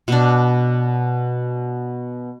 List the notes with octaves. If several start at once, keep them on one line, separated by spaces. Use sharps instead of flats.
B2 D4